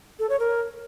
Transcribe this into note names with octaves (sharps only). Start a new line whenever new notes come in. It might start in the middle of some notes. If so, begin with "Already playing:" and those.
A4
C#5
A#4